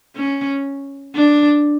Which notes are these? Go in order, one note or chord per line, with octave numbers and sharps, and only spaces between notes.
C#4
D4